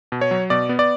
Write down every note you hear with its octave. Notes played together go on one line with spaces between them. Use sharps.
B2
C#5
F#3
B2 D5
B3
D5